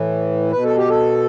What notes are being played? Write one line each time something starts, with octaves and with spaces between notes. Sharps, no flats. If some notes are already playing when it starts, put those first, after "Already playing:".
Already playing: A2 E3
B2 B4
A4
G4
A4